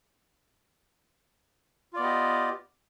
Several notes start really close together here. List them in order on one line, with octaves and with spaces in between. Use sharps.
F4 D5 B3 D#5 G4